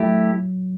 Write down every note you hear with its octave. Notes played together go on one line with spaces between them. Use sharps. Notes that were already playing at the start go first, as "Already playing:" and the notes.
Already playing: F#3 A3 E4 G4